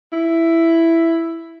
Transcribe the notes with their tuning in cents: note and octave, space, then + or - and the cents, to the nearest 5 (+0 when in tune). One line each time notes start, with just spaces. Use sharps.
E4 +5